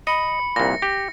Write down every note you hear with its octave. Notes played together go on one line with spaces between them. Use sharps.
D#5 B5 C#7
C2 A#2 A#6
G4